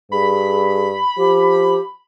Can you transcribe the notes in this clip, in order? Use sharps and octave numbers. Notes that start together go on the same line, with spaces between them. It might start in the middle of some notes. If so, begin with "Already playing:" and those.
G2 G#4 B5
F3 G4